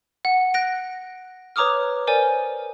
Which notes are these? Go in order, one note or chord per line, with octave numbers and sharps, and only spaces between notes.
F#5
F#6 A#6 D7
B4 C#5 A#5 D6 D#6 F6
A#4 C5 D5 G#5